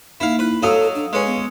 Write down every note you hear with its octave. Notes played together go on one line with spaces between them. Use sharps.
A#3 D#4 E4 F5
E4 B4
F#3 A4 D#5 F5 D#6 E6
D4
G#3 C#4 B4
B3